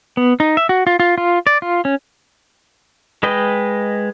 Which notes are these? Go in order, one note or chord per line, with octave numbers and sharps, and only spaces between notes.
B3
D#4
E5
F#4
F4
F4
F4
D5
F4
C#4
G#3 B4 D#5 G5